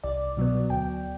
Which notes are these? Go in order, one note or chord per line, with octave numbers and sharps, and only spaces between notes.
C2 D5
B2 F#3 B3
D2 G5